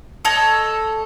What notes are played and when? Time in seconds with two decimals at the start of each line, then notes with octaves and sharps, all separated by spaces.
0.25 A4 C#5 D#5